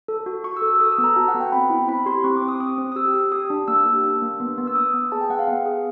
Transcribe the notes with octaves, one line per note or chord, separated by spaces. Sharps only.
A4
F#4
F#4 C#6
E6
A4
E6
A4 D#6
E6
B3
A#5
F#4 A5
F#5
B3
G5
C4 B5
E4
C4 B5
G4 C6
C4 C#6
D6
C4
D#6
C4 D#6
C4
D#6
G4 E6
G4
G4 D#6
D4
A#3 E6
G4
D4
A#3
B3
B3
E6
B3 D#6
B3
G#4 A5
G5
B3 F#5
F5
B3
G#4